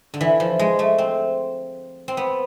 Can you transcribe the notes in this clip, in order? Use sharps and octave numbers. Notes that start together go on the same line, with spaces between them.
D3
E3
F3
G#3
A3
C4
C4
B3